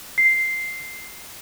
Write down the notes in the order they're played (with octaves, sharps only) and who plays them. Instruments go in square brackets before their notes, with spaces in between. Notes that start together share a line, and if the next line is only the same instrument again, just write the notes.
[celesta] C7